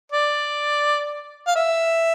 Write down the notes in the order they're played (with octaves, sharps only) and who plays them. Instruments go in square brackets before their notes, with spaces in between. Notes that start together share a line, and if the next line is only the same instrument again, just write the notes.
[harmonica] D5
F5
E5